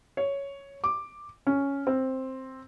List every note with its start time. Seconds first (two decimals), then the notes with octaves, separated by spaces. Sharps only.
0.17 C#5
0.84 D6
1.47 C#4
1.87 C4